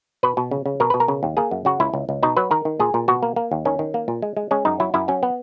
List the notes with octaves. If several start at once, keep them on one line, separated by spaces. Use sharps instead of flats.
B2 B4
B2
C#3
C#3
B2 A#4
B2 B4
A#4
C#3
D#2
A#3 G#4
F#2
C#3 F#4
C#2 E4
C#2
C#2
B2 D#4
F#3 B4
D#3 A#4
D#3
A#2 G#4
A#2
B2 F#4
A#3
A#3
D#2
D#3 C#4
D#3
A#3
A#2
G#3
G#3
G#3 C#4
F#2 D#4
F#3 E4
F#2 E4
F#3 C#4
B3